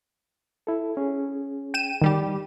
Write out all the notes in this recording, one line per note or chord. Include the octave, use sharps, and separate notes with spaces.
E4 A4
C#4 G#4
G5 D#7 E7
D#3 G3 G4